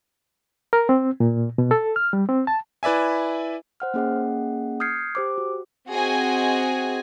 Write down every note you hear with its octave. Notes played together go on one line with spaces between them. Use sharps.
A#4
C4
A#2
B2
A4
F6
G3
C4
A5
E4 B4 D5 E5 G#5
C5 F#5 F6
A#3 C#4 G#4 D#5 F#5
D#6 F6 G6 G#6 C7 C#7
G4 C5 D6
F#4
C4 F#4 G#4 D#5 G#5